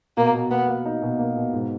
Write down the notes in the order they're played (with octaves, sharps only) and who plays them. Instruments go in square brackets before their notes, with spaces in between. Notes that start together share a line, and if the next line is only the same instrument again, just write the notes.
[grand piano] B2 [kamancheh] A#3
[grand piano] B2
[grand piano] A#3 [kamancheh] B3
[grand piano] A#3
D#4
B2
A#3
B2
G#2